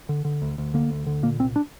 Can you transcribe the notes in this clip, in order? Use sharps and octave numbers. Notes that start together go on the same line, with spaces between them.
D3
D3
D2
D2
D3 A#3
D2
D3
A#2 A#3
C2 C4
D4